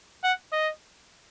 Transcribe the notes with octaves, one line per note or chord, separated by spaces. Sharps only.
F#5
D#5